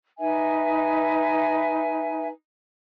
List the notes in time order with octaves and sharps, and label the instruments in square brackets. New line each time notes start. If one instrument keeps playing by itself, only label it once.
[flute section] D#4 B4 E5 G#5